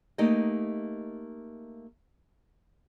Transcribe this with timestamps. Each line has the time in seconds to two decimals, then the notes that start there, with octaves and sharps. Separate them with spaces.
0.18 A3 A#3 D#4 G4 D#5